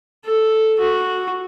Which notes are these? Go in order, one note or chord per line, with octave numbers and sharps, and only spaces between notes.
A4
F#4